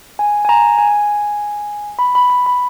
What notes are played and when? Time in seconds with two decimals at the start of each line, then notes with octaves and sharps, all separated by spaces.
0.19 G#5
0.45 G#5
0.49 A#5
0.78 G#5
1.99 B5
2.15 B5
2.30 B5
2.46 B5